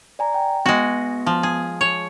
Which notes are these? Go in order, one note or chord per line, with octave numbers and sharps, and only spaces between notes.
D5 G#5 A#5
G5
G#3 B3 F#4
F3
G#4
C#5